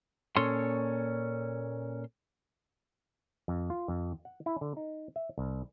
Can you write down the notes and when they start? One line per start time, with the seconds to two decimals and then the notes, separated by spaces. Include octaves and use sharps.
0.37 A#2 C#4 A4 C#5 C6
3.48 F2
3.70 F4
3.88 F2
4.25 F#5
4.46 E4
4.61 D3
4.77 D#4
5.16 E5
5.38 C2